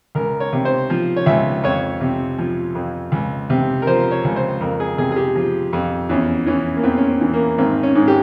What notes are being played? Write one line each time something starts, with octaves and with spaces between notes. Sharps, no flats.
C#2 A#4
C#5
C3
C5
F3
C#5
C#2 E5
F2 C#5
C3
F3
F2
C#2
C3
A#4
F3 C5
C#5
C#2
C5
F2 A#4
G#4
C3 G#4
G#4
G4
F3
F2
E2 C#4
E3 C#4
A#3
E2 C4
C#4
C4
E3
A#3
G#1 C4
C#4
G#2
G4